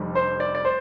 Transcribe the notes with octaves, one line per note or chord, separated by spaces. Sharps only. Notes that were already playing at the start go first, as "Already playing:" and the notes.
Already playing: F1 F2 D3 G3
C5
D5
D5
C5